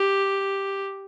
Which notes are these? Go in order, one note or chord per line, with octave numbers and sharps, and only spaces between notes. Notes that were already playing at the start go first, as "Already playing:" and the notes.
Already playing: G4